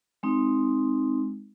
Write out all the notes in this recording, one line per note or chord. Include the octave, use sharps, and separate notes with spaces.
G#3 C4 D#4